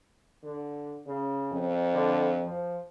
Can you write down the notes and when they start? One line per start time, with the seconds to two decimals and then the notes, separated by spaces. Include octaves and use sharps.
0.43 D3
1.06 C#3
1.52 F2
1.94 D3
2.45 F3